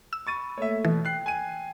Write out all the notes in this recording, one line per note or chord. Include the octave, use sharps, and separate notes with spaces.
E6
B5 C#6 A6 D#7
A3 A#3 A4 C#5 E5
B2 E3
G5 F#6 C7
G#5 D#7